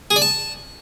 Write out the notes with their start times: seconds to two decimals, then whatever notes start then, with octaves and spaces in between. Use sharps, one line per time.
0.11 G#4
0.16 D5
0.22 A5